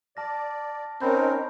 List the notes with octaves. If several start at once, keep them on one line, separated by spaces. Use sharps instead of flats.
D5 A5 F6 A#6
C4 C#4 D#4 A#4 B5 G6